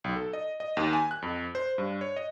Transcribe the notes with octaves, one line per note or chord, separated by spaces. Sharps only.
B1
A4
D#5
D#5
D#2
G#5
F#6
F2
C5
G2
C#5
D#5